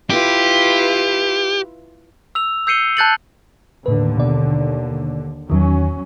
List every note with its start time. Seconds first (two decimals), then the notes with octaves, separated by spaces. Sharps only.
0.10 E4 F4 G4 B4
2.35 E6 F7
2.67 E6 G6 C7 C#7 D#7 G7
2.97 A5 F#6 G6 A6 C#7 F#7
3.86 D#2 A2 D3 B4
4.17 B2 D5
5.50 E2 D#3 F#3 C#4